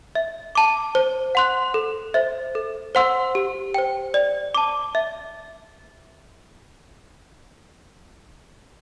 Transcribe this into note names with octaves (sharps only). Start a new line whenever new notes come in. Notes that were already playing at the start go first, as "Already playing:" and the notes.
E5
A5 D6
C5
F#5 C6 F#6
A4
C5 E5
A4
C5 F#5 C6 E6
G4
C5 G5
D5
A5 D6
E5